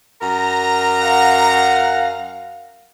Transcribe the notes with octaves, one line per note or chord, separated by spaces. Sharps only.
F#2 A#4 A#5
F5 F#5